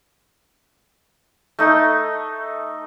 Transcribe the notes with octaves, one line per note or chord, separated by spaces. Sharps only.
A3 D#4